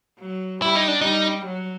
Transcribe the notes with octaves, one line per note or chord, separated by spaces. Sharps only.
F#3
G3 E4
D#4
D4
G3 D#4
F#3